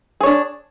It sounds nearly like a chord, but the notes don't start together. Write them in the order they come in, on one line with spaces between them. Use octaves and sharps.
G#4 C#5 D4